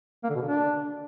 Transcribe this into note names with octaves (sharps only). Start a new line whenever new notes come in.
A#3
D3
B2
D3
D4